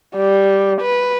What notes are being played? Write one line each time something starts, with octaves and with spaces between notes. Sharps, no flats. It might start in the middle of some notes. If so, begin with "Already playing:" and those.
G3
B4